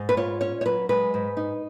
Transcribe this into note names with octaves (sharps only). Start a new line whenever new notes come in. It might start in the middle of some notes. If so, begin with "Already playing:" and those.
Already playing: G#2
B4
F4 C#5
C#4 C#5
C#5
F#3 B4
G#3 B4
G#2
D#4